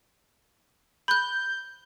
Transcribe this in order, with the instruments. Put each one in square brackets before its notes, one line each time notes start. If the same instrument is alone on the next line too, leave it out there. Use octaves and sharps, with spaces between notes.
[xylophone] B5 F#6 [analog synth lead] G6